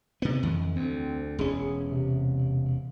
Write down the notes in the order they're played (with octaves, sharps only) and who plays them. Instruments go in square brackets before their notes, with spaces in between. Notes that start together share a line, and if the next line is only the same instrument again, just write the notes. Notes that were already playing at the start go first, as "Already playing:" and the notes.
[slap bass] C3 B3
[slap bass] F2 [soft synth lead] E3
[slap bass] D2 [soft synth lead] C4
[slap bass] E1 C#4 [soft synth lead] G#4
[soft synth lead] C3